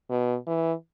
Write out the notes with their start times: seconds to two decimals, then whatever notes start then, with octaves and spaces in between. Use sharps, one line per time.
0.10 B2
0.47 E3